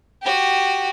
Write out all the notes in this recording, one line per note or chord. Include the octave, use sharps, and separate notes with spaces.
F#4 G4